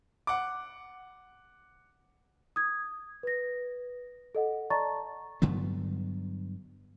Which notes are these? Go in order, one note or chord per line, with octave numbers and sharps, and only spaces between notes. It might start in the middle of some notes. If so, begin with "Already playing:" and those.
F#5 D6
D#6 G#6
B4 A#6
A4 D#5 F#5
D5 D#5 A5 A#5 C#6 A6
G2 D3 F#3 B3